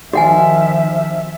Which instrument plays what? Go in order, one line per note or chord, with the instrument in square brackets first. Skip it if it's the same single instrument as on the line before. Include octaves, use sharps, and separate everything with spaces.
[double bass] D#3 F3 [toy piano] F#4 F#5 G#5 [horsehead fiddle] E5